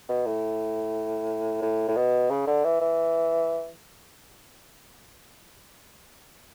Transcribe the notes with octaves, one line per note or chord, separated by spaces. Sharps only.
B2
A2
A2
A2
B2
C#3
D3
E3
E3